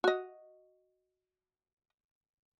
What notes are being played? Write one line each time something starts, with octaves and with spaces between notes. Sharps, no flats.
F#4 D#5